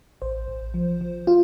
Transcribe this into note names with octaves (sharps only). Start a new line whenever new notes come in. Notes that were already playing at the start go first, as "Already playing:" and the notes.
A1 C5
A1
F3
F3
F4